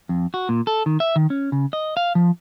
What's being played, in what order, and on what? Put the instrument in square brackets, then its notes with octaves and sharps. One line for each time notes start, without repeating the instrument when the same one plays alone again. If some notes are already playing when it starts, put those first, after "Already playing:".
[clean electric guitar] F2
F#4
A#2
A4
D#3
E5
D#3
C#4
C#3
D#5
F5
F3